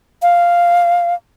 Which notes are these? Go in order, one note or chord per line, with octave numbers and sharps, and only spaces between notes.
F5